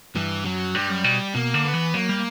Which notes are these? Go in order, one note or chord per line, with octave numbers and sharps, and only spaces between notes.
G2 E3
F#2 F#3
G2 G3
F#2
B2
B2 A#3
D3
B3
E3
F#3 A#3
G3